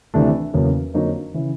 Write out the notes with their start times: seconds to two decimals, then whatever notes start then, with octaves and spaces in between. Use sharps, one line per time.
0.14 D2 C3 E3 A3 D4
0.54 E2 C#3 F#3 A#3
0.94 F2 D3 F#3 A#3 D#4
1.34 C#3 E3